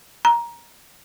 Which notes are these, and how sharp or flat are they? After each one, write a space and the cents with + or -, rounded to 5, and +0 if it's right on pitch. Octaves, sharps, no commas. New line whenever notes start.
A#5 +15